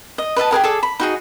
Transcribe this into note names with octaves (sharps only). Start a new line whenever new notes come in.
D#5
B4 D#5 E5 A5
G4 G#4 A#4 F#5
G#4 A4 D5
B5
D#4 F#4 G#4